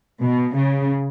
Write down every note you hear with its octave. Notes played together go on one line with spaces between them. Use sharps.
B2
C#3